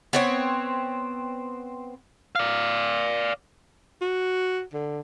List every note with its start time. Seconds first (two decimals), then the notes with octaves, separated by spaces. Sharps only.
0.13 B3 C4 C#5
2.36 D5 F5
4.01 F#4
4.74 D3